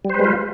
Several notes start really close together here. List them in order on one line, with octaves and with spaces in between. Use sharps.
G3 C5 B4 G#3 F4